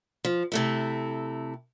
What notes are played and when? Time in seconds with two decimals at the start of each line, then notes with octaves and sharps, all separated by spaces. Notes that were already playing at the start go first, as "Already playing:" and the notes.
0.25 F3
0.52 C3 A3 E4